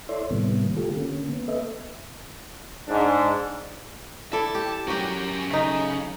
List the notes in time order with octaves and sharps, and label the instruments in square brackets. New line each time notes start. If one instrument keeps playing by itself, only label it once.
[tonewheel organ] E4 A4 C#5 D5 E5 C6
A2 C3 D#3 G3 A#3 B3
D3 A3 F4 G4 A4
D3 A#3 C#4
B3
A#3 A4 B4 D#5 E5
[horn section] G#2 D4
[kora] E4 A4 D5 [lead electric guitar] A5
[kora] G4
[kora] F#3 G4 [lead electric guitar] C#4 A#4
[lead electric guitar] C#3 [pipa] A3 D#4